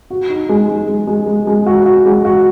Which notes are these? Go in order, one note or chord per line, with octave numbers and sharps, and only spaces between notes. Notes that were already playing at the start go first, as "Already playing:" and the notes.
F#4
D#4
G#3
G#3
G#3
G#3
G#3
G#3
F#4
F#4
G#3
F#4